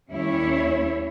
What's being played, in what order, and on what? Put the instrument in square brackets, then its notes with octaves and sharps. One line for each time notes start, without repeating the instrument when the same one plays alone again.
[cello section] D#2 G3 C#4 E4 C#5 E5